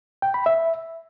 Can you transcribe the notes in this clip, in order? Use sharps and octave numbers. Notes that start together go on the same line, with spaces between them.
G5
B5
E5